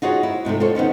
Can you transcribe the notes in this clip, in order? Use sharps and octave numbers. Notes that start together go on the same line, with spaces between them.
D#4 F4 F#4 G#4 C#5
E4
G#2 C3 F3 A3
F4 A4 C5 C#5
D#3 B3 C#4 D#4